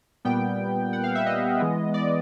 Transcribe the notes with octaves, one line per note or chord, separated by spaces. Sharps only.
A#2 G3 B3 G5
F#5
F5
E5
D#5
E3 G#3 B3
D5